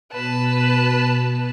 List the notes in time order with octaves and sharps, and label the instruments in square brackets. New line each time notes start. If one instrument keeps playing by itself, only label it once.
[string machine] B2 [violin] B4 A5